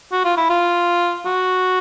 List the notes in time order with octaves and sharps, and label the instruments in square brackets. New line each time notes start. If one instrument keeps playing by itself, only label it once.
[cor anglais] F#4
F4
E4
F4
F#4